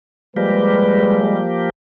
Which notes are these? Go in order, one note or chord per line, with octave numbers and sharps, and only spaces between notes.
F3 G3 G#3 A#3 G4 B4